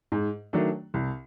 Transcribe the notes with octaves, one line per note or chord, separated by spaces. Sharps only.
G#2
D#3 F#3 A3 D4
C2